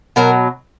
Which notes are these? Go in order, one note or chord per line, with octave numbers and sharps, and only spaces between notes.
B2 F#3 A#4